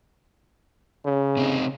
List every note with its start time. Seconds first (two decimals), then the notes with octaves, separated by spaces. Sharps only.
1.05 C#3
1.37 C3 C4 D#4